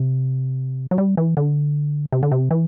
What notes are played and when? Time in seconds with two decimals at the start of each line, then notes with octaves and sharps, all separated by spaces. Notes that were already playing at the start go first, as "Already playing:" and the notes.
Already playing: C3
0.91 F#3
0.98 G3
1.17 E3
1.37 D3
2.12 C3
2.23 D3
2.31 C3
2.51 E3